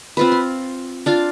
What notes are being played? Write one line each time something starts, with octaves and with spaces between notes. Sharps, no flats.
C4 F4 B4
C6
D4 F4 F5